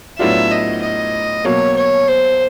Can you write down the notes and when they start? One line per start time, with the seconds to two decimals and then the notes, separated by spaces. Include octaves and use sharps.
0.19 A2 F#3 B3 D4 F4 E5
0.51 D#5
0.82 D#5
1.45 B2 F#3 A#3 C#5
1.77 C#5
2.08 C5